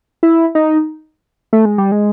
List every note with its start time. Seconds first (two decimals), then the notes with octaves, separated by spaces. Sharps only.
0.23 E4
0.55 D#4
1.53 A3
1.65 G#3
1.78 G3
1.92 G#3